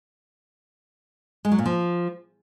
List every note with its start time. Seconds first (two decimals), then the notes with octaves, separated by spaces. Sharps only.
1.45 G#3
1.52 F#3
1.59 A#2
1.66 F3